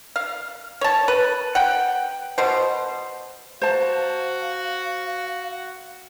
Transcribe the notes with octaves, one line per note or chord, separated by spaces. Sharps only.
F5
C#5 A5
B4
F#5 G5
B2 C5
F#4 C5 F5 A5